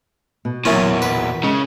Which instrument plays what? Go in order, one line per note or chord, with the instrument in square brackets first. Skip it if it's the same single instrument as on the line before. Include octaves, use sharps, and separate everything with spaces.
[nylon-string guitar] B2
[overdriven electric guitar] E2 A#2 [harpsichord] F#3 C#4 [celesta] E4 A#4 E5
[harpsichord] B4
[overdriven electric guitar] C#3 [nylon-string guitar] G#3